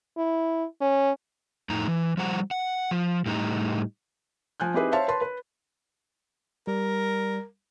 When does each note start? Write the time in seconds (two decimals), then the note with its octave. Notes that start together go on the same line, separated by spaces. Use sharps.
0.17 E4
0.81 C#4
1.70 F2 A2 D#4 A#5
1.88 E3
2.17 F3 G3 C5 F#5 A#5
2.51 F#5
2.91 F3
3.26 A2 G3 D#4 A#5
4.60 F3 G#5 F#6 G6
4.74 C4 D#4 E4 G4 G#4 B4
4.92 C5 C#5 E5 F5 A5 C6
5.08 B4 A5 C6
5.21 B4
6.67 G3 A#4 D5